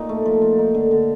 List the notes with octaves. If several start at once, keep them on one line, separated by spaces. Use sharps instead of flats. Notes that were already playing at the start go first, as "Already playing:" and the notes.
Already playing: A#2 D#4
A3
F3
F3
D#4
D3
D3